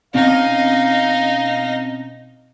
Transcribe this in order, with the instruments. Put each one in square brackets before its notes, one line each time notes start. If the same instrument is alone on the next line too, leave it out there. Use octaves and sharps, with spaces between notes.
[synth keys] B2 C4 C#4 [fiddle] D#4 D#5 [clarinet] F5